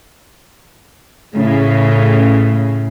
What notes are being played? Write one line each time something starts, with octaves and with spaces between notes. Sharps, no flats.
A2 C#3